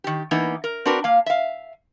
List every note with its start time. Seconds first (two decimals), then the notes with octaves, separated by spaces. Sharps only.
0.04 D#3 G4
0.31 E3 A#3 B3 D#4
0.64 A#4
0.85 C4 D4 F#4 A#4 B4
1.04 A#3 F5
1.26 E5 F5